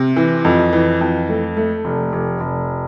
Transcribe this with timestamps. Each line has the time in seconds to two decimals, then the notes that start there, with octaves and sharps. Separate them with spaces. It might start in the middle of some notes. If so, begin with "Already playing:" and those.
Already playing: C3
0.16 E3
0.45 F2
0.73 E3
1.01 F2
1.29 A3
1.57 A3
1.85 F1
2.13 F1
2.41 F1